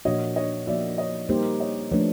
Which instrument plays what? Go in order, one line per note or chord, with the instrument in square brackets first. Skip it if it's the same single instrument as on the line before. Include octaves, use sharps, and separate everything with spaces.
[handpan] A#2 F3 A#3 D4 F#4 [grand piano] C#5 D#5
[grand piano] C#5 D#5
[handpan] F3 A#3 D#4 F#4 [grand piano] D5 E5
[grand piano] C#5 D#5
[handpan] G3 A#3 D#4 G4 C5
[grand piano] C#5 D#5
[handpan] F3 A3 D4 [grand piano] B4 C#5